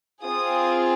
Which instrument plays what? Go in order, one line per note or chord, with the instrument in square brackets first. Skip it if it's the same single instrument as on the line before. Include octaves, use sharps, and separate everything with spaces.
[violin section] C4 F4 G#4 D#6